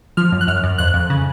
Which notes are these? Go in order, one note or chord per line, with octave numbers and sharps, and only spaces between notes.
F3 F6
F#2
F#6
F#2 F6
F#2
F2 F#6
F2
C#3